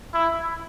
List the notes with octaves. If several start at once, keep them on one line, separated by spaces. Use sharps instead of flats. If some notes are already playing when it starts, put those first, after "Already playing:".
E4